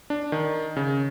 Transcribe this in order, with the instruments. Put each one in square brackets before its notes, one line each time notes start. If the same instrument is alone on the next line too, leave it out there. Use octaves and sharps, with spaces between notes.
[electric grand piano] D4
D#3
C#3